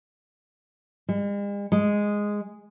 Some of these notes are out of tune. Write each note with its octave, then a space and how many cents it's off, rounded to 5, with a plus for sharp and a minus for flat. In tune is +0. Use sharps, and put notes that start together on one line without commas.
G#3 -45
G#3 -5